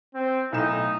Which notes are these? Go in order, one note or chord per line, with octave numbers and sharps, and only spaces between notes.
C4
B1 A2 D#4 E7